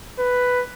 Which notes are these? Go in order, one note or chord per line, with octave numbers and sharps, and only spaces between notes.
B4